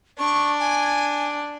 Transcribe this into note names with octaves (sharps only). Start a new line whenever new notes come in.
D4 C#6
G#5